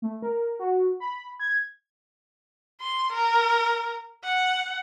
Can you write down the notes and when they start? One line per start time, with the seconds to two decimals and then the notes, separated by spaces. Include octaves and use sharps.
0.02 A3
0.22 A#4
0.59 F#4
1.00 B5
1.40 G#6
2.81 C6
3.13 A#4
4.24 F#5